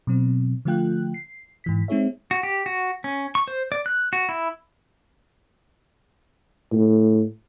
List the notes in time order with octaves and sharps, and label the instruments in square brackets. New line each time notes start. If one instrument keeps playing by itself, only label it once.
[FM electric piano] B2 F#3 C4
D3 F3 A3 F4 G5 F#6
C7
G#2 E3 B6
G#3 C4 D#4 G#4 C#5 E5
[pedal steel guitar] F#4
G4
F#4
C#4
C#6
C5
D5
F#6
F#4
E4
[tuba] A2